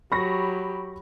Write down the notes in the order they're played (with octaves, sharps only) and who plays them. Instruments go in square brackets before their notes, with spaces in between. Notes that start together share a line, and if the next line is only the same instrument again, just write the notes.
[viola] F#3 G4 [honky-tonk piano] B5 C#6 A#6